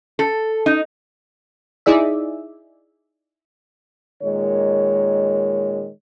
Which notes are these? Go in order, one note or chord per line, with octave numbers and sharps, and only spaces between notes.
A4
D#4
D#4 E4 G#4 D5 E5
A#2 D#3 G#3 C#5